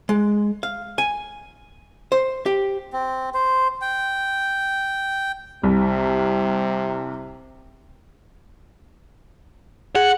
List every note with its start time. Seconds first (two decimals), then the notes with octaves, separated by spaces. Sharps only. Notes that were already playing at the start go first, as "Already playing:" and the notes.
0.09 G#3
0.63 F5
0.98 G#5
2.12 C5
2.46 G4
2.93 C4
3.34 C5
3.82 G5
5.63 C2 C3
9.95 G#4 F#5